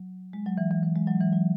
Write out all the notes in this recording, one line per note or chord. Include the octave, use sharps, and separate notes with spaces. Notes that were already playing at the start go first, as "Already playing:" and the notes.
Already playing: F#3
G#3
F#3
E3
E3
E3
G#3
F#3
E3
F#3